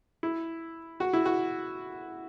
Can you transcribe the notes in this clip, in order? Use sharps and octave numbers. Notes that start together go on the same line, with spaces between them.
E4
F#4
E4
F#4